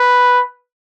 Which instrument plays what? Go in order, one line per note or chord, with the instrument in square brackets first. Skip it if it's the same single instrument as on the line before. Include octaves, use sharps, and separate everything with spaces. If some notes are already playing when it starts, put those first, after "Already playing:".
Already playing: [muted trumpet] B4